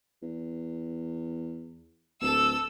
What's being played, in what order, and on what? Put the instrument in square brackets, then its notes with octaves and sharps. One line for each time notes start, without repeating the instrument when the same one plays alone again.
[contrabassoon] E2
[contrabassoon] D1 [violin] A4 E6